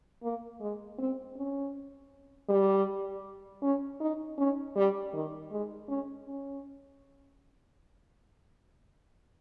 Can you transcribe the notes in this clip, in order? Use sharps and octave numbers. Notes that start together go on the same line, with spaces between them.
A#3
G#3
C4
C#4
G3
C#4
D#4
C#4
G3
D#3
G#3
C#4
C#4